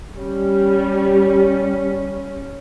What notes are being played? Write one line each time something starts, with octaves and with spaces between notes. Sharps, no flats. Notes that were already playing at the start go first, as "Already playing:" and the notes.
G3 C#4